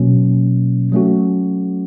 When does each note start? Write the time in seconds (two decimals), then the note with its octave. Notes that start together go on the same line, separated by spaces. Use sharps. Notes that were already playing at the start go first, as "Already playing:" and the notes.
Already playing: B2 F#3 A#3 C#4
0.92 F#3 A3 C#4 F#4